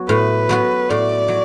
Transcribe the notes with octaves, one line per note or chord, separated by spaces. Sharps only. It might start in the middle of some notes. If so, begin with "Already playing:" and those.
Already playing: F#3 B3 F#4
A2 B4
F#3 B3 F#4
A2 D5
F#3